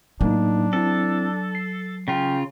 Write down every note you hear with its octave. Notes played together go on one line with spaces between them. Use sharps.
A2 F#3 A#3 D4 D#4
C4 E4 A4
C7
C#3 F4 G5